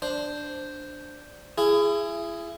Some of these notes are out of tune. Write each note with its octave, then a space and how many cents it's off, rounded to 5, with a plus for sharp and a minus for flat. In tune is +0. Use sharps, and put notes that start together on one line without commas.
D4 +0 C5 +0
E4 +35 G#4 +0